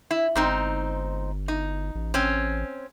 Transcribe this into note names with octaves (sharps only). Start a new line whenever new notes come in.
E4
G1 G#2 C4 D#4
D#4
A1
C4 C#4